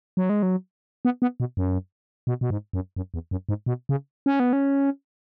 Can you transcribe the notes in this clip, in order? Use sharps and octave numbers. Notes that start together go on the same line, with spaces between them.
F#3
G#3
F#3
B3
B3
B2
F#2
B2
B2
G#2
F#2
F#2
E2
F#2
G#2
B2
C#3
C#4
B3
C#4